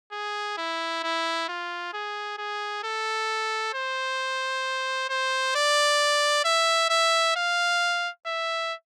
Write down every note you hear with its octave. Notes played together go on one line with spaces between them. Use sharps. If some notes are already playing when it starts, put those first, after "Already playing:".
G#4
E4
E4
F4
G#4
G#4
A4
C5
C5
D5
E5
E5
F5
E5